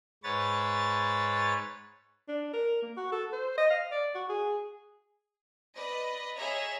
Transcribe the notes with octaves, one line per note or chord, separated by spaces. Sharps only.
G#2 B4 C#5 A6
D4
A#4
A#3
F#4
A4
C5
D#5
F5
D5
F#4
G#4
B4 D5 D#5
G#4 C#5 D#5 E5 A#5